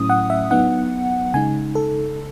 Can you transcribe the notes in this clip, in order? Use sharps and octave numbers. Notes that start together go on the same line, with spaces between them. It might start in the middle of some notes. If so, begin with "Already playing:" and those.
Already playing: A2 F#3 A3 C#4 E4 D#6
F#5
E5
F#3 B3 D#4 F#5
C#3 G#3 D#4 G#5
A4